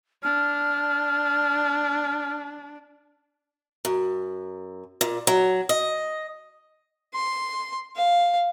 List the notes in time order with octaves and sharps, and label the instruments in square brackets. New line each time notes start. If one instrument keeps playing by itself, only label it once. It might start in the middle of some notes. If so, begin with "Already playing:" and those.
[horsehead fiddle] D4 [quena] F6
[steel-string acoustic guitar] F#2
A#2
F#3
D#5
[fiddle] C6
F5